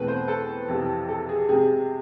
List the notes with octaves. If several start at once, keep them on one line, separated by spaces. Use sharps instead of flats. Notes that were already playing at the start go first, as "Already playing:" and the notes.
Already playing: E2 B2 A3 C4 B4
C5
A4
F2 C3 E3
A4
G#4
C3 G#3 C4 G#4